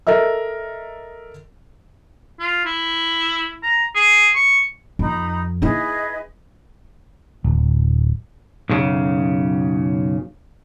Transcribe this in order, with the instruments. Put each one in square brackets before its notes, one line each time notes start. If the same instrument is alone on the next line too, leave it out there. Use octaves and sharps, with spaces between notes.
[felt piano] A4 A#4 D#5 E5 E6
[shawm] F4
E4
A#5
G#4
C#6
[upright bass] F2 [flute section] D#4 B5
[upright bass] D#4 E4 [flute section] G#4 B4 D#5
[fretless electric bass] D1
[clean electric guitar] B1 F#2 C#3